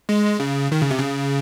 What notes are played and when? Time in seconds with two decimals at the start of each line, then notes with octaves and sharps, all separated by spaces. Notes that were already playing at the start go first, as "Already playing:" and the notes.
0.09 G#3
0.40 C#3
0.72 D#3
0.82 C#3
0.90 C3
0.99 C#3